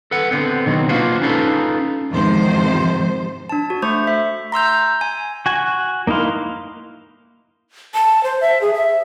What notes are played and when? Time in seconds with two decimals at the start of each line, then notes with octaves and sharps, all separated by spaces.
0.11 A4 B4 F#5
0.31 D3 B3 C4
0.66 B2 D#3 F#3 C4
0.89 A#3 D4 F4 F#4 B4 C5
1.22 C#4 D#4 F4 A4 B4 A5
2.10 E2 G#2 C3 D#3 F3 C5
3.49 D4 A5
3.70 F#4
3.82 A3 C5 C#6
4.07 E5
4.52 A#5 C6 E6 G6
5.01 G#5
5.46 F#4 G#5
6.07 A#3 D#4 E4 F5 C6
7.94 A5
8.24 C5
8.41 E5
8.61 G#4
8.74 E5